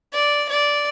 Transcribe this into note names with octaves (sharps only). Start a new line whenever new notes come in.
D5
D5